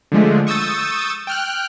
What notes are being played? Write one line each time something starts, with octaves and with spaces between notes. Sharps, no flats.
D3 F3 G#3 A3
C#6 D#6 E6 G6 A6
G5 F6 F#6